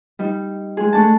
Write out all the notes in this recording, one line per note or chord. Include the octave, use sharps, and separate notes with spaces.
G3 D#4
G#3 G#4
A3 D4 A5